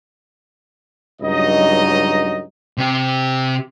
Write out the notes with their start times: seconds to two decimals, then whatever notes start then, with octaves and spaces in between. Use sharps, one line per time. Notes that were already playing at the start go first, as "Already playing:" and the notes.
1.21 C#2 G2 F#3 D#4 D#5
2.78 C3 G4